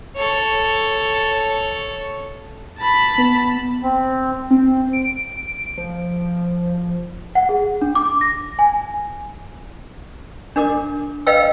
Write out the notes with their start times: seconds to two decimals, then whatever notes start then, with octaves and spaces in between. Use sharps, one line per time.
0.16 A4 C#5
2.79 A5 B5
3.18 B3
3.83 C4
4.51 C4
4.93 D7
5.78 F3
7.35 F#5
7.49 G#4
7.81 D4
7.95 D6
8.21 A#6
8.59 G#5
10.56 D4 A#4 D6
11.27 B4 D#5 F5 G5 E6